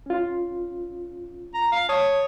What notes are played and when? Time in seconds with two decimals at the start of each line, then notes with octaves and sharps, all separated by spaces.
0.06 C#4 F4
1.54 A#5
1.72 F5
1.89 C#5 A5 D#6